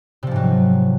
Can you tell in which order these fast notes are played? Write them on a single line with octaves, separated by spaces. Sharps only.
C3 F3 G#2 F#3